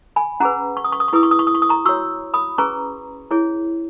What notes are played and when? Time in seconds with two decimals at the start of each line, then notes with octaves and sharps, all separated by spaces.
0.16 G#5 B5
0.40 C#4 G#4 B4 F#5 A#5
0.77 C#6
0.84 D#6
0.92 C#6
1.00 D#6
1.08 C#6
1.13 E4 G#4 B4 D#6
1.23 C#6
1.31 D#6
1.39 C#6
1.47 D#6
1.55 C#6
1.62 D#6
1.69 A#5 C#6
1.85 F#4 C#6 E6
1.89 C#5
2.34 B5 D#6
2.58 C#4 G#4 B4 A#5 C#6
3.31 E4 G#4 C#5